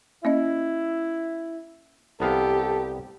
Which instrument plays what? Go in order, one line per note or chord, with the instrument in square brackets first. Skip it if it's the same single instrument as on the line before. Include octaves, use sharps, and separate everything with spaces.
[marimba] A#3 C#4 D#5 [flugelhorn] E4
[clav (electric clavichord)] C2 B3 F5 [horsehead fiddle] G4 [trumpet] A4